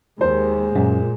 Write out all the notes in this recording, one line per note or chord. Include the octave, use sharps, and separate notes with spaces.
D#2 G#3 C5
F#2 A#2